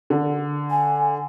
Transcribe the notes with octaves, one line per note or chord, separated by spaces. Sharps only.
D3
G#5